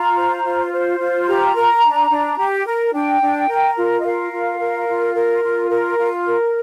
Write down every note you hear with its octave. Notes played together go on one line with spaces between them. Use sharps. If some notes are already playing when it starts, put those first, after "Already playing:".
Already playing: F4 A#5
C5
F4
C5
F4
C6
G4 A#5
A#4
D4
D4
G4
A#4
D4 G5
D4
A#4
F4
D#5
A#4 F5
F4
A#4
F4
A#4
F4
A#4
F4
A#4